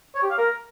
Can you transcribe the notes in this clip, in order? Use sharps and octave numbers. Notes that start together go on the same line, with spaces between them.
C#5
G4
F5
A#4